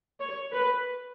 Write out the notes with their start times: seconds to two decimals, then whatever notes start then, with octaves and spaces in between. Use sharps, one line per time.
0.20 C#5
0.53 B4